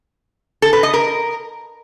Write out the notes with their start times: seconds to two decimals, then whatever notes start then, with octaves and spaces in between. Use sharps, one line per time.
0.62 A4
0.73 B4
0.83 D#5
0.94 A#4